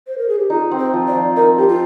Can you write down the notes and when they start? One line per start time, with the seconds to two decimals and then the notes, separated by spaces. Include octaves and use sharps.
0.07 C5
0.18 A#4
0.29 G#4
0.39 G4
0.50 D#4 F4
0.71 C4
0.79 C5
0.94 F3
1.07 D5
1.15 F3
1.36 D#4 A#4
1.58 C4 G4
1.69 F4